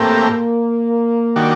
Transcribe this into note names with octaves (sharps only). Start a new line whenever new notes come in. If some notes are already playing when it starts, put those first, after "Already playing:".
Already playing: A2 A3 A#3 C4 G4 A#4
D#3 G3 D4 F#4